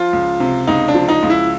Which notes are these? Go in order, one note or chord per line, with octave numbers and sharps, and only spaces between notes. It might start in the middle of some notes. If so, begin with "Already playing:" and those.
Already playing: F3 F4
C#2
C3
C#2 D#4
D4
F3
D#4
C#2
E4